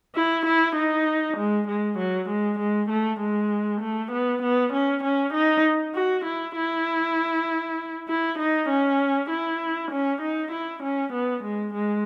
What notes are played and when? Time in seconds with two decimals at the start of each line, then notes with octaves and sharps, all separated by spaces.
0.15 E4
0.46 E4
0.76 D#4
1.38 G#3
1.68 G#3
1.99 F#3
2.29 G#3
2.59 G#3
2.90 A3
3.20 G#3
3.81 A3
4.12 B3
4.42 B3
4.73 C#4
5.04 C#4
5.34 D#4
5.95 F#4
6.25 E4
6.56 E4
8.08 E4
8.39 D#4
8.69 C#4
9.30 E4
9.92 C#4
10.22 D#4
10.52 E4
10.83 C#4
11.13 B3
11.44 G#3
11.74 G#3